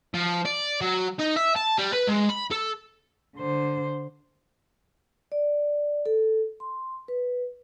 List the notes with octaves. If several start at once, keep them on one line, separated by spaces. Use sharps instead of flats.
F3
D5
F#3
D#4
E5
A5
G3
B4
G#3
B5
A4
D3 C5
D5
A4
C6
B4